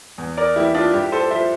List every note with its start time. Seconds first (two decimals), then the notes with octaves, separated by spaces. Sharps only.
0.18 E2
0.37 A#4 D5
0.56 E3 G3 E4 G4
0.75 D4 F4
0.93 G2 E4 G4
1.12 A4 C5
1.31 F3 C5 E5